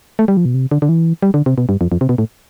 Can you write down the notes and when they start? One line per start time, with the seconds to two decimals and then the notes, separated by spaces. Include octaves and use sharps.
0.19 A3
0.28 G3
0.37 F3
0.45 B2
0.54 C3
0.71 D3
0.82 D3
0.89 E3
1.23 G3
1.34 D3
1.46 C3
1.58 B2
1.69 G2
1.81 F2
1.92 F2
2.01 C3
2.09 B2
2.18 A2